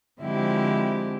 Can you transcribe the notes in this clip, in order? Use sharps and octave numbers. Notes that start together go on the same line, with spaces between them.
D3 F3 G#3 C4 E4 G4